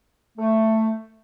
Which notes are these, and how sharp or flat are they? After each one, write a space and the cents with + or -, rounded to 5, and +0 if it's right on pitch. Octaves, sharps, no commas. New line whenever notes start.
A3 +10